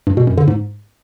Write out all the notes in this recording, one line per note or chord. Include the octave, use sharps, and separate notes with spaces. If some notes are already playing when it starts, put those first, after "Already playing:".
G2
B2
F#2
D3
G#2